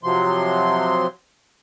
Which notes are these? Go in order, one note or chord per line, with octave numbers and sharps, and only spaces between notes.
C3 F3 F#3 C6